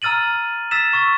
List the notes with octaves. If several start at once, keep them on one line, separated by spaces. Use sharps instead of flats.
A#5 E6 F6 A6 D#7 F#7
E6 A6 B6 E7
C#6 E6 A6